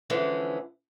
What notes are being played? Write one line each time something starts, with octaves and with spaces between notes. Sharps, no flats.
D3 E3 F3 G#3 C#4